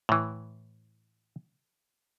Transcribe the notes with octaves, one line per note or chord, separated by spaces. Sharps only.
A2 E3